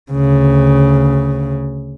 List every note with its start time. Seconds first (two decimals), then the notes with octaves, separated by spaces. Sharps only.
0.12 D2 C#3